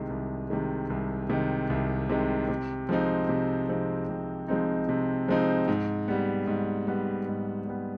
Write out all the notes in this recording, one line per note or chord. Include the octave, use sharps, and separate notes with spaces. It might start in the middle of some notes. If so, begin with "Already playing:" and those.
Already playing: C2 C3 D#3 G#3
C2
C3 D#3 G#3
C2
C3 D#3 G#3
C2
C3 D#3 G#3
C3
F3 G#3 C4 D#4
C3
F3 G#3 C4 D#4
C3
F3 G#3 C4 D#4
C3
F3 G#3 C4 D#4
G#2
G3 B3
G#2
G3 B3
G#2
G3 B3